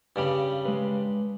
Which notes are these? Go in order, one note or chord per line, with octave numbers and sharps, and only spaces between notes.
G2 C#3 G3
G#3 B4